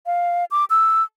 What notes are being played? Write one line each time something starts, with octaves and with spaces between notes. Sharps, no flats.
F5
D6
E6